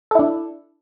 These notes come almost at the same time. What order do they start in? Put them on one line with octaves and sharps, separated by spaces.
A4 E4 D4